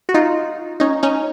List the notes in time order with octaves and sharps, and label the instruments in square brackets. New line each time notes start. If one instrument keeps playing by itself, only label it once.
[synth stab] F#4
D#4 F4
C#4 D#4
C#4 D#4